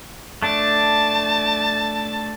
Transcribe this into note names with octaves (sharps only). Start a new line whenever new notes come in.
A3 D4 A5